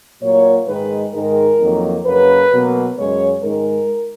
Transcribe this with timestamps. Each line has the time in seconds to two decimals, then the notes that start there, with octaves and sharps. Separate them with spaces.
0.22 A#2 F#3 A#3 C#5
0.67 G#2 D#3 G#3 B4
1.13 G#2 D#3 G#3 A#4
1.60 F2 D#3 F#3 A#3
2.05 F#2 C#3 F#3 A#3 B4
2.51 B2 F#3 A#3
2.97 F#2 C#3 G#3 C#5
3.43 G#2 D#3 G#3 A#4